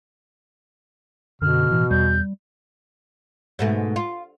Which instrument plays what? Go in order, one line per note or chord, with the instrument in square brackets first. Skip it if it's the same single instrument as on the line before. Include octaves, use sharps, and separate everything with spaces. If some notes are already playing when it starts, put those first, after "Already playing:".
[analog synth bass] F#2 [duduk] B2 [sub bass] D3 [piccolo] F6
[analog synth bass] A2 [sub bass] E3
[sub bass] E2 [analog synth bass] G3 [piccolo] G6
[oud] G#2 B2 A3
F4